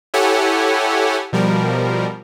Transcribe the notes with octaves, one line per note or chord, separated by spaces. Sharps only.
E4 G4 A4 C#5 F#5 G#5
B2 F3 G3 A#4